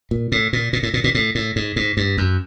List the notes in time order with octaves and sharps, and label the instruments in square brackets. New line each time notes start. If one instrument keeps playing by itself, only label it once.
[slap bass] A#2
A2
A#2
A#2
A2
A#2
A#2
A2
A2
G#2
G#2
G2
F#2